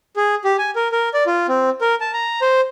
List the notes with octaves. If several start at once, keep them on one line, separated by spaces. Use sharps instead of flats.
G#4
G4
G#5
A#4
A#4
D5
F4
C4
A#4
A5
A#5
C5